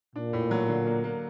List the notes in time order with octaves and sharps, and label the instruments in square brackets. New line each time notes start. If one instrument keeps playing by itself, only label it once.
[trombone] A#2 [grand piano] D4
[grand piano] A2
F#3
D3
A#3
A#3